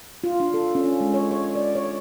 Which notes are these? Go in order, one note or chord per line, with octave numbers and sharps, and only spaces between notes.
F4
D4
A4
C#4
G#3
C#5
C#5
D5
C#5